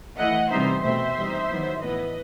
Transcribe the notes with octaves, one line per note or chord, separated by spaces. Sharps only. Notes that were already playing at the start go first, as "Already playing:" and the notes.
E3 A3 E4 D#5 F#5
C3 E3 G3 B3 D#4 C5 E5
B2 A3 C4 C5 E5
E3 G3 D#4
D#3 F#3 B3 E4
A2 E3 B3 E4 B4 D#5